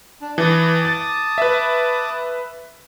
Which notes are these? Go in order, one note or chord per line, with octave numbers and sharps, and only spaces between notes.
D4
E3 A5 D6 D#6
A6
B4 E5